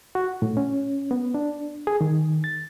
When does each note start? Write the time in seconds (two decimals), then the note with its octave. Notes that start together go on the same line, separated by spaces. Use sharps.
0.15 F#4
0.42 A2
0.57 C#4
1.11 B3
1.34 D4
1.87 G#4
2.01 D#3
2.44 A6